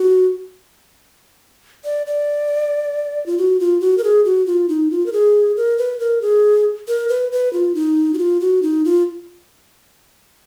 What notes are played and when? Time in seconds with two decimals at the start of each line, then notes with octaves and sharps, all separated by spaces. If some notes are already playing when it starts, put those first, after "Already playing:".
Already playing: F#4
1.84 D5
2.06 D5
3.26 F4
3.38 F#4
3.60 F4
3.81 F#4
3.98 A#4
4.04 G#4
4.25 F#4
4.46 F4
4.69 D#4
4.90 F4
5.06 A#4
5.13 G#4
5.57 A#4
5.78 B4
6.00 A#4
6.22 G#4
6.88 A#4
7.09 B4
7.32 B4
7.53 F4
7.75 D#4
8.14 F#4
8.18 F4
8.40 F#4
8.62 D#4
8.85 F4